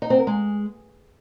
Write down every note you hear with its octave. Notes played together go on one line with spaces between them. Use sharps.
D#4
C4
A#4
G#3